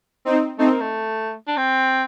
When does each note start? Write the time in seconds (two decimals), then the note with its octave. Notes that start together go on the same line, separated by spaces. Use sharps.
0.25 C4 D#4
0.58 A3 C4 D#4
0.69 A#3
0.80 A3
1.47 D4
1.57 C4